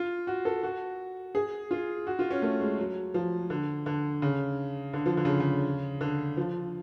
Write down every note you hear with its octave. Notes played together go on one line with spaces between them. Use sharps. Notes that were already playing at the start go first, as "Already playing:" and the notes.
Already playing: F4
F#4
A4
F#4
G#4
F4
F#4
F4
C#4
A3
G#3
F#3
F3
D3
D3
C#3
D3
F3
D3
C#3
C#3
D3
F3